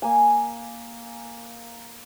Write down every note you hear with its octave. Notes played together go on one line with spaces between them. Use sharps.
A#3 G#5